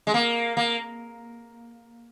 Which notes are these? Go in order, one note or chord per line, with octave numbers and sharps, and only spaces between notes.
G#3
A#3
A#3